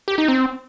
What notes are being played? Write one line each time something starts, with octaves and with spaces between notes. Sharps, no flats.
G4
D#4
C4